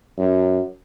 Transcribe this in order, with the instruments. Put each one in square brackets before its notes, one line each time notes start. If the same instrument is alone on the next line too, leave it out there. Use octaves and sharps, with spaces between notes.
[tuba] F#2